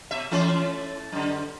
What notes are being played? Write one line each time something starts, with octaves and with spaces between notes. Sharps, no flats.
B2 E5
E3 A3 C#4
F#2 D3